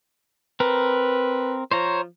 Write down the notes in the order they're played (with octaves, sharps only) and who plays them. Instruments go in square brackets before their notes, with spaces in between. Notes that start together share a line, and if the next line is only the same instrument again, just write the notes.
[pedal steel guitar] C4 A#4 [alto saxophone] B4
[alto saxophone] F3 [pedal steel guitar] C5 C#5 A#5